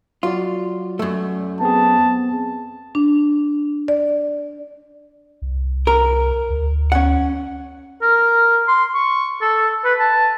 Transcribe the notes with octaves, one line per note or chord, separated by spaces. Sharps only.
F#3 F4 F#4 D5
F#2 A3
B3 C4 G#4 A5
D4
D5
C2
A#4
D2
C#4 F#5
A#4
C6
C#6
A4
B4
A5